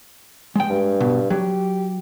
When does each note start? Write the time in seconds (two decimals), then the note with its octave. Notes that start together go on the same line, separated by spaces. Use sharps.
0.56 G#3 G5
0.70 G2
1.00 B2
1.30 F#3 G4